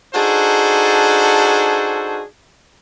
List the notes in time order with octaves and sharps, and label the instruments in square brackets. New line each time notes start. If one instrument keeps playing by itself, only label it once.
[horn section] D4 D#4 F#4 G#4 A4 C5